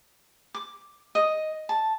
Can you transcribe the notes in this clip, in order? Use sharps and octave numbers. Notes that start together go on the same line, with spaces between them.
D6
D#5
A5